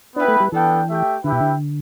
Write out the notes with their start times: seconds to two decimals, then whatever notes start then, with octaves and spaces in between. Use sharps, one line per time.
0.16 B3 D4 E4 B4 G5
0.28 A3
0.40 G3
0.52 E3 B3 D4 A4 G5
0.89 A3 G4 E5 G5
1.24 D3 E4 G4 B4 E5 G5
1.32 B2
1.41 D3